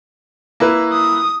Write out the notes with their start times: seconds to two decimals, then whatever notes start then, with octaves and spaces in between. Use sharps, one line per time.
0.60 A#3 E4 B4
0.93 D#6